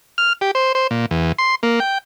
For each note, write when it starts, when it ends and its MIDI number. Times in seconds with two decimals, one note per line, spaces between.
0.18 0.33 89
0.41 0.51 67
0.55 0.72 72
0.75 0.87 72
0.91 1.06 46
1.11 1.32 40
1.38 1.55 84
1.63 1.80 58
1.80 1.98 79